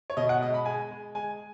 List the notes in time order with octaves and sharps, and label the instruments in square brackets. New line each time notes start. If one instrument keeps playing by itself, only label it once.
[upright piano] C#5
B2 D#5
F#5
G#3 D#5
B5
G#3 G#5
G#3
G#3 G#5